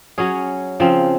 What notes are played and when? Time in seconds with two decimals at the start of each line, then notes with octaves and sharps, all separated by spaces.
0.18 F#3 C#4 G#4
0.80 C#3 F3 C4